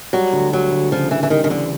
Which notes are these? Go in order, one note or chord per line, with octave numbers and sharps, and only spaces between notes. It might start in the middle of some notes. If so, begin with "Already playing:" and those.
F#3 G3
D2
F#3 G3
D2
C#3 F3
C#3 E3
E3
D#3 G3
D#3
D3 E3